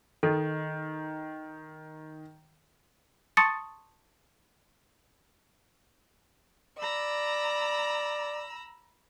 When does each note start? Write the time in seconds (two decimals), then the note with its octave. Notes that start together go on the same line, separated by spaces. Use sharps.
0.23 D#3 D#4 A4
3.37 A5 C6 C#6 D#6 A6 C#7
6.78 D5 A#5 B5 E6